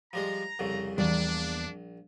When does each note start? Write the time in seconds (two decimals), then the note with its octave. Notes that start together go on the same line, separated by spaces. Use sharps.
0.13 F3 G3 G#3 A#5
0.59 C2 F2 C#3
0.98 A#1 E2 G3 A#3 D4 D5